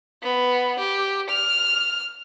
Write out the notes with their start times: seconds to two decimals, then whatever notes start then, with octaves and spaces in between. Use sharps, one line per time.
0.22 B3
0.79 G4
1.29 F6